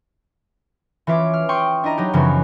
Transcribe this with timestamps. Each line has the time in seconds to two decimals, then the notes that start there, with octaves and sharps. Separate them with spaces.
1.07 E3 C#4 F4 E5 D6
1.33 F6
1.49 G5 C6 C#6 D#6
1.84 D4 E4 D#5 A#5
1.98 F#3 D#4 G4
2.13 F#2 C#3 E3 F3 B3 C#4